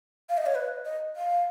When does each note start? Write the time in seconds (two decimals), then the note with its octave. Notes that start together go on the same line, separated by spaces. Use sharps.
0.29 F5
0.37 D#5
0.46 C#5
0.55 B4
0.85 D#5
1.16 F5